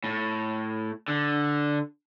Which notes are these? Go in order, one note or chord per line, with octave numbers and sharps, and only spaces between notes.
A2
D3